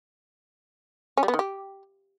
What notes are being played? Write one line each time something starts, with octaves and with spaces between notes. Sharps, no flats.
C#4
G3
B3
D#3
G4